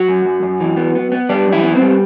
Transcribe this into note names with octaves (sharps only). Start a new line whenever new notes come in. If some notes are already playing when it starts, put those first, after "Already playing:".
Already playing: F#3 F#4
F#2
F#2
F#2
E3
B3
B3
B3
G3 D4
F#2
E3 E4
B3
C4
G3